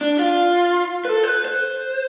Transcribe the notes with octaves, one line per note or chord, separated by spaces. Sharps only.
D4
F4
B4
A4
C5
B4
C5